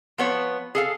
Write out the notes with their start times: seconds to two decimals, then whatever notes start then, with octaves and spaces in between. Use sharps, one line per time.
0.18 F3 B3 C#5
0.75 G#4 A4 F5